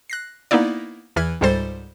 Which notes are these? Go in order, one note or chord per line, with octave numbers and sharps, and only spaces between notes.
F#6 A#6 C7
A#3 B3 D#4 E4 D5
E2 E3 B4 F6 G#6
C#2 G#2 G3 A4 C5 A6